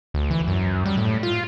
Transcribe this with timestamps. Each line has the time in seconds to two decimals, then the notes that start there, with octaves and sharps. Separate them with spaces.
0.14 D2
0.31 E3
0.48 F#2
0.86 G3
0.97 A2
1.23 F4